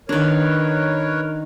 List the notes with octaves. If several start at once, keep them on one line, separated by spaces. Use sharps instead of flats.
D#3 D4 A#4 B4 C#5